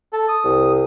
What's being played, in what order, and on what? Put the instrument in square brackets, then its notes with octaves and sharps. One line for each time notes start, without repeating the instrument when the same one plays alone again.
[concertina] A4
D#6
[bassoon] C2